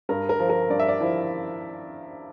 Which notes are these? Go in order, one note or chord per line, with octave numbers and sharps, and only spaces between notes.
G2 A#4
A#4
F3
A#4
G2 D5
E5
D5
F3 E4